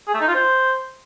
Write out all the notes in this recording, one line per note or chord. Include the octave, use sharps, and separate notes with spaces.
G#4
A3
D#4
F4
C5